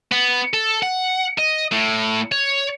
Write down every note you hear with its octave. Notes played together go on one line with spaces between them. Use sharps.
B3
A4
F#5
D#5
A2
C#5